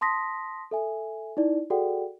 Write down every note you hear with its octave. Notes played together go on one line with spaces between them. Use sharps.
A5 C6 D#6 A#6 B6
A4 E5 G#5
D#4 E4 D5
F#4 G#4 A4 D5 F#5 G5